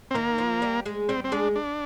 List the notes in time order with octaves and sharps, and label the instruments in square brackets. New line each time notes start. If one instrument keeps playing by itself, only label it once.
[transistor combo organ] C4
[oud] D#3 D#4 [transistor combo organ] A#3
[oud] F3 F4
G3 G4
G#3 G#4
[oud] G3 G4 [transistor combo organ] C4
[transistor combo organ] C4
[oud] G#3 G#4 [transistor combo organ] D4
[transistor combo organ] D4